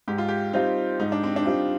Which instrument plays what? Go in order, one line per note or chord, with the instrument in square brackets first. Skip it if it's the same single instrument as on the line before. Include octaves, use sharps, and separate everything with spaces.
[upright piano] G#2 [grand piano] G4
[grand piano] F4
G4
[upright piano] G3 C4 F4 [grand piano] D#4
[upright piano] G#2 [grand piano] D#4
[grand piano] D4
C4
D4
[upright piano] G3 C4 F4